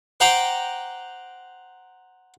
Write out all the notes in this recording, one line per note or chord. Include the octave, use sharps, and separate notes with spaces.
C5 F#5 G5 A#5 C6 D6